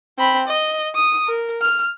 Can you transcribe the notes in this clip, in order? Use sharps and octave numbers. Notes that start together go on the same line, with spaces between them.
C4 B5
D#5
D#6
A#4
F6